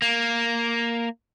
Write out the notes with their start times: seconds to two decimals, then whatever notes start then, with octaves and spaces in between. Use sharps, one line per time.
0.02 A#3